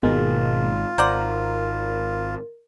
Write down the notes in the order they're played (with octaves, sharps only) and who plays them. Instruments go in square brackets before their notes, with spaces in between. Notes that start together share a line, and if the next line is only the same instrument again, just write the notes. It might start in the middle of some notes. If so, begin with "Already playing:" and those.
[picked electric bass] G#1 G#2 D#3 [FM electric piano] B2 G#3 A#3 [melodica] F4
[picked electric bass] G#1 [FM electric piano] A#4 [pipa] C5 D5 F#5